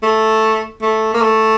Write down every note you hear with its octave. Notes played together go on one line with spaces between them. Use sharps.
A3
A3
A#3
A3